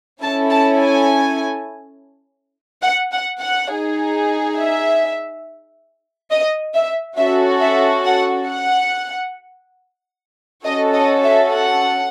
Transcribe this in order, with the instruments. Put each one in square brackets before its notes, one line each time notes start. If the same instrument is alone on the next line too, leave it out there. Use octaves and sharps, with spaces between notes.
[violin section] C#4 E4 A4 A5
A5
G#5
F#5
F#5
F#5
D#4 G#4
E5
D#5
E5
C#4 F#4 A4 E5
E5
F#5
F#5
C#4 F#4 A4 D#5
D#5
E5
F#5